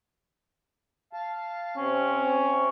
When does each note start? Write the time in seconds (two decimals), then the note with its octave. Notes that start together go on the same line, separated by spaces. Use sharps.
1.13 F5 A5
1.76 C3 C4 C#4